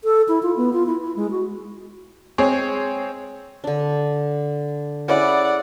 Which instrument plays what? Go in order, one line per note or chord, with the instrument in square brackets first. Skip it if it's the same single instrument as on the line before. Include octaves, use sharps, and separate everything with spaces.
[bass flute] A4
E4
F4
B3
F4
E4
E4
G#3
F#4
[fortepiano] G#3 C4 G#4 C#5
[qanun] D3 D4
[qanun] C#4 E4 G#4 [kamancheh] D5 F#5